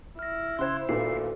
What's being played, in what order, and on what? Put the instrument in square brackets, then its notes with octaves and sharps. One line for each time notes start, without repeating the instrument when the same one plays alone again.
[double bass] E4 [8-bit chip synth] F6 A#6
[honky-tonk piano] C#3 C5 [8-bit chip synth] C6 F#6 G#6
[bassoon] D2 [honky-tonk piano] A#2 D#3 B3 [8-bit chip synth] C7